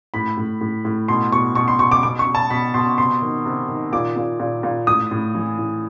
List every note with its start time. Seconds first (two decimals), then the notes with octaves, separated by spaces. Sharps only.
0.14 A2 B5
0.37 A2
0.61 A2
0.85 A2
1.08 B2 C6
1.32 B2 C#6
1.55 B2 C#6
1.68 C6
1.79 B2 C#6
1.92 D6
2.03 B2 D6
2.19 C#6
2.27 B2
2.35 A5
2.50 B2 B5
2.74 B2 C6
2.98 C3 C6
3.22 D#3
3.46 C3
3.69 D#3
3.93 A#2 D6
4.16 A#2
4.40 A#2
4.63 A#2
4.87 A2 D#6
5.11 A2
5.35 E3
5.59 A2